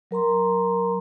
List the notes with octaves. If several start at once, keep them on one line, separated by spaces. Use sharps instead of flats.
F#3 A#4 A#5 C6